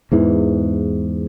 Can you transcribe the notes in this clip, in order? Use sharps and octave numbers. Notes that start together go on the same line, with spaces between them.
E2 G#2 E3